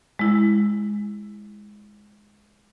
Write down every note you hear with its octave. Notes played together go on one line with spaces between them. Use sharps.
G#3 E4